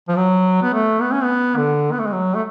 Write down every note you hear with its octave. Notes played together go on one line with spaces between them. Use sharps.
F3
F#3
B3
A3
B3
C#4
B3
D3
B3
A3
G#3
F#3
A3